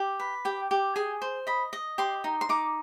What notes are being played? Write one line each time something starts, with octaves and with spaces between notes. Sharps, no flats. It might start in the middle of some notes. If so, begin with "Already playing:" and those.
Already playing: G4
B4
G4 G5
G4
G#4 G#5
C5
D#5 B5
D#5
G4 C6
D#4
C6
D#4 D6